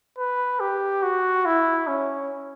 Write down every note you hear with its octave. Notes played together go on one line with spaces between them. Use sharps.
B4
G4
F#4
E4
C#4